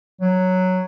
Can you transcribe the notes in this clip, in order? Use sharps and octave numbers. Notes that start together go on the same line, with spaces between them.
F#3